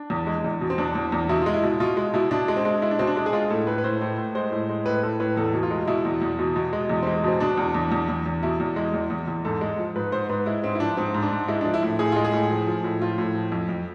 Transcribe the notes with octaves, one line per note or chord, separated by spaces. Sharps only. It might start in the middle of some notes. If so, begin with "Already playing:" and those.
Already playing: D4
E2
G#3
E2
B2
C4
E2 D4
E2
E2
B2 E4
G#3 F4
E4
B2
B2 F4
G#3
B2 E4
B2 D4
G#3
C4
G#3
G#3 E4
D4
B2 C4
D4
G#3
G#4
G#3 F4
A2 A4
A2 B4
B4
A2 C5
A2
A2
G#3 C5
A2
G#3
A2 B4
A2 A4
A2 B4
E2 A4
B2
F4
G#3
B2 E4
E2
E2
B2
B2
G#3
E2
C4
G#3
B2 C4
B2 D4
E2
E2
E2
E2
E2
B2 E4
E2
G#3
E2
E2
E2
G#2 A4
G#3
F3
G#2 B4
G#2 C5
G#2 B4
G#3 E4
G#2 C4
E4
F3 D4
G#2 C4
G#2
D4
G#2
G#3 E4
F3 D4
E4
A2
A2 G#4
G#3 F4
G#4
A2
F3
F3
A2
F3 F4
A2
F3
F2
F2